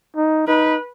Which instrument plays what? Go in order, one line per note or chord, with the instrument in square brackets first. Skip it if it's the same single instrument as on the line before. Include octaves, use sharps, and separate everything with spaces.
[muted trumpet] D#4
[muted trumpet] D#4 [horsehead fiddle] B4